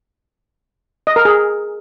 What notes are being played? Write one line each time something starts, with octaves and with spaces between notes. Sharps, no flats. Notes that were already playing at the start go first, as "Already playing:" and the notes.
D#5
A#4
G#4